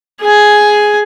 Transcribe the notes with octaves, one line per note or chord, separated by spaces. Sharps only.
G#4 G#5